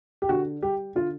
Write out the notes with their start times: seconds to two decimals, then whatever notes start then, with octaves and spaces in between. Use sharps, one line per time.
0.22 G4
0.29 D3 F#4
0.62 G3 G4
0.95 D3 F4